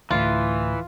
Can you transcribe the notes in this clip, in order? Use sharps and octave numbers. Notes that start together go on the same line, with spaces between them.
D2 A2 E3 F4